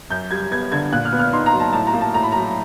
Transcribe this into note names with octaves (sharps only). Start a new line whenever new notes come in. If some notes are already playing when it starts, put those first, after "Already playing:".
F#2 G6
G3 G#6
B3 G#6
D3 G#6
A#2 F#6
F6
B3
F6
D#4 C6
A#5
F#3
A5
A2 A5
A#5
A#3
A5
A2 A#5
B5
F#3 A#5